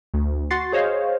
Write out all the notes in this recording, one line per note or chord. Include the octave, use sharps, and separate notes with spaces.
D2
F#4 F#5 C6 A6 C7
G#4 C5 C#5 D#5 F5